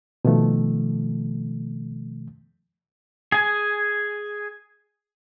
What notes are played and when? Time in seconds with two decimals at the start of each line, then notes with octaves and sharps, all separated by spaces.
0.25 B2 D#3 F3 A3
3.32 G#4 G#5